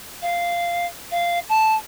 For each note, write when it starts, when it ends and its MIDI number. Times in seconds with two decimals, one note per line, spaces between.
0.22 0.86 77
1.12 1.39 77
1.49 1.75 81